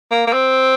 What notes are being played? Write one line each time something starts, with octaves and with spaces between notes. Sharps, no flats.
A#3
A#3
C4